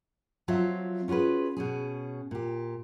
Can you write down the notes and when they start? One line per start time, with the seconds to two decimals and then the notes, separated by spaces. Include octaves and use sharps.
0.48 F3 F#3 C4 F4 C#5 E5
1.08 C#4 F4 F#4 G#4 B4
1.57 B2 C#4 G#4
2.31 A#2 G4